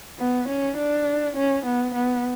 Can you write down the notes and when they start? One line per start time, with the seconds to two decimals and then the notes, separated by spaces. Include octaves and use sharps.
0.19 B3
0.48 C#4
0.77 D4
1.36 C#4
1.66 B3
1.95 B3